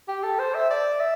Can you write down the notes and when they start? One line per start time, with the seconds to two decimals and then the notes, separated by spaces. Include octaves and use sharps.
0.08 G4
0.24 A4
0.39 C5
0.55 E5
0.71 D5
1.00 E5